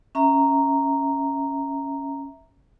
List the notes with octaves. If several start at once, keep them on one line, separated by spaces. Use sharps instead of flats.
C#4 E5 A#5